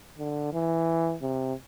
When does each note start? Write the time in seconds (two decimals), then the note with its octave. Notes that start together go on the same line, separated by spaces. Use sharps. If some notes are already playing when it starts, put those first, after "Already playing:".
0.18 D3
0.53 E3
1.22 C3